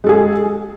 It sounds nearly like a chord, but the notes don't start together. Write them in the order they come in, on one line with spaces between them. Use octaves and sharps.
G#3 A4 G#4